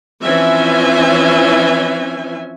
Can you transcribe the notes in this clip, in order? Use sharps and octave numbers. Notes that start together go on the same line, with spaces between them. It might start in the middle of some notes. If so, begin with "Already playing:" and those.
E3 F3 C4 C#4 E5 G#5